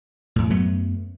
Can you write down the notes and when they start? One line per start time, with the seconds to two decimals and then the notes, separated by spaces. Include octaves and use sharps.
0.36 E2 A2
0.50 F#2 F#3 A3 B3